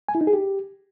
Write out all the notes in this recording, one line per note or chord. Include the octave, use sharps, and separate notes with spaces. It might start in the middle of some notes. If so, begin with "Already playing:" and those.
G#5
E4
D#4
G#4
G4